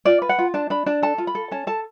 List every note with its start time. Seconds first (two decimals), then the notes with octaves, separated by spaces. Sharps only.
0.05 F4 D5
0.22 B4
0.29 F#5
0.39 F4
0.54 D4 A5
0.70 D4 B5
0.86 D4 A5
1.03 A4 A5
1.18 F4
1.27 B5
1.35 A4
1.51 C#4 A5
1.67 A4 A5